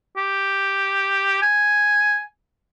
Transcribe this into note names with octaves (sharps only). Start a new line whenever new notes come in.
G4
G#5